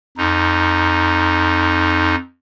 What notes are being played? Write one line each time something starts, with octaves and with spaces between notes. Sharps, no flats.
F2 D#4